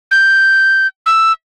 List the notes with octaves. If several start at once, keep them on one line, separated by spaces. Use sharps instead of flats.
G6
E6